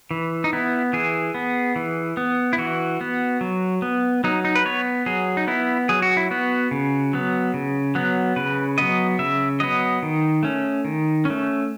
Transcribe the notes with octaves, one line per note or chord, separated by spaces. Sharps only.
E3
D#4
B3 E4
E3 G#4
B3
E3
B3
E4
E3 F#4
B3
F#3
B3
F#3 D#4
D#4
B4
B3 C#5
F#3 G#4
D#4
B3 E4
F#3 G#4
F#4
E4
B3 F#4
C#3
F#3 B3
C#3
F#3 B3
C#3 B4
F#3 B3 D#5
C#3 E5
F#3 B3 D#5
D#3
A3 C#4
D#3
A3 C#4